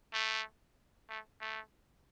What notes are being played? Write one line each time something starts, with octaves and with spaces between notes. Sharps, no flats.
A3
A3
A3